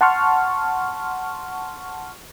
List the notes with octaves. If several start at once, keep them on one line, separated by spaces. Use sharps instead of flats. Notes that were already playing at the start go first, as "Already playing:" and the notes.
F#5 A5 C6 C#6 F6